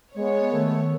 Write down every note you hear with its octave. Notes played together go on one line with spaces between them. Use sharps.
G#3 B3 C#5
D#3 A3